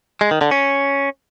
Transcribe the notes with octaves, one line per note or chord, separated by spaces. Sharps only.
G#3
D#3
D3
C#4